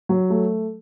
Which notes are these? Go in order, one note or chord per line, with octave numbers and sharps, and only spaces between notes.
F#3
A3